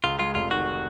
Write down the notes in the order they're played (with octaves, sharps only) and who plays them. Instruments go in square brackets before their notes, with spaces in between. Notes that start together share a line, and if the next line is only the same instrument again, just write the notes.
[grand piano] C#2 [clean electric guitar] F4
[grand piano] G#3 [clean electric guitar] F4
[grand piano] F1 [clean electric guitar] F4
[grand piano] D#3 [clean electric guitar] F#4